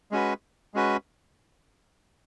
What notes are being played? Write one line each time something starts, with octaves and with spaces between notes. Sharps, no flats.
G#3 C#4 F#4 B4
G#3 C#4 F#4 B4